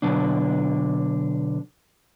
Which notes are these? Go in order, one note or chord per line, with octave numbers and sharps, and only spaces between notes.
B2 D3 F#3 D4